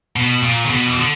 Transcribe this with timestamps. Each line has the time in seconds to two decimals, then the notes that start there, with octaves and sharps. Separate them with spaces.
0.16 B2
0.43 A#2
0.65 C#3
0.70 B2
0.87 E3
0.97 D3